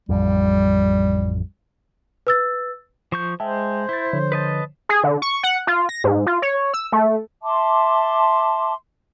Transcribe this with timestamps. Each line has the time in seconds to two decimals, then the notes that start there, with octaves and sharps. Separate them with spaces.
0.09 A1 F2 G3
2.27 B4 E6 A6
3.12 F3 C#6 G6
3.40 G#3 C5 E5 G5 A5
3.89 E4 G6 A6
4.13 D3 F3 C#5
4.32 B4 D#5 A5
4.89 G#4
5.04 D3
5.22 C#6
5.43 F#5
5.67 F4
5.89 A#6
6.04 G#2
6.27 F4
6.42 C#5
6.74 E6
6.92 A3
7.43 E5 A5 C6 D6